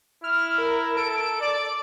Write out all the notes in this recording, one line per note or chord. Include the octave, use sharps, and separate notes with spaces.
E4 F6
A#4
A4 D7
D5